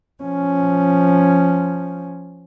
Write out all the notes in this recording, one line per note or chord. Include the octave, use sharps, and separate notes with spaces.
F3 C#4